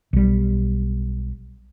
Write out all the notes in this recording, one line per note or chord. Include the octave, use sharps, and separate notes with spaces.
B1 G3